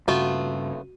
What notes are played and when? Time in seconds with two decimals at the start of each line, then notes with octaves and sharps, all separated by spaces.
0.08 G2 C#3 A3 B3 F4 F#4 D#7